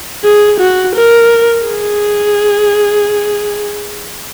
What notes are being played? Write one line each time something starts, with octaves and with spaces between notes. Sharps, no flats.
G#4
F#4
A#4
G#4